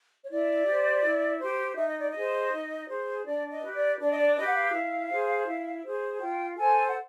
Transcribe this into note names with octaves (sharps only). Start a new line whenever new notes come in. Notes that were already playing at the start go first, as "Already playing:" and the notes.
C#5
E4 D5
G4 C5
E4
G4 C5
D#4 E5
D#5
D5
D#5
G#4 C5
D#4
G#4 C5
D4 D5
D#5
G4 B4
D5
D4 D5
D#5
D5
G4 B4 D#5
F#5
F5
E4
G#4 C5
E4
G#4 C5
F4 G5
A4 C5 G#5
F#5